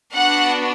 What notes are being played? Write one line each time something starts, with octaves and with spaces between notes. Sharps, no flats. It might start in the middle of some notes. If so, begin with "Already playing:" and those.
B3 D4 F#4 F#5